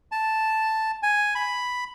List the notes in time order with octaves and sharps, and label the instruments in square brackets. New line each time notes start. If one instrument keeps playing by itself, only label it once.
[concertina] A5
G#5
B5